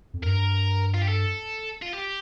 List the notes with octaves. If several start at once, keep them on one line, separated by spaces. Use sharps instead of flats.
F2
G2 A#4
F4
G4
A4
F4
G4